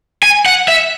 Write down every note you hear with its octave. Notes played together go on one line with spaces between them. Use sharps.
G#5
F#5
E5